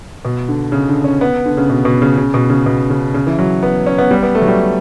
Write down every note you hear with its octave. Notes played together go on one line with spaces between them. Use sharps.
B2
D3
C#3
D3
C#4
B3
D3
C#3
B2
B2
C#3
C#3
B2
C#3
B2
C#3
C#3
E3
F#3
B3
C#4
B3
G3
B3
A3
F#3
G3